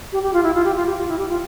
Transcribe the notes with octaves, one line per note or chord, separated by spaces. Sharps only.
G4
G4
F4
E4
F4
G4
F4
G4
F4
E4
G4
F4